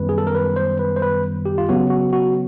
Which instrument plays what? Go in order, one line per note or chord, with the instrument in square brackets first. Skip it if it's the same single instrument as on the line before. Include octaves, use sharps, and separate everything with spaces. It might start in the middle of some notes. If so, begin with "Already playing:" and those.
Already playing: [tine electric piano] F#2 D#3 G3 B3 B4
G#4
A4
A#4
B4
C5
B4
C5
B4
G4
F4
C#3 F#3 B3 F#4
F#4
F#4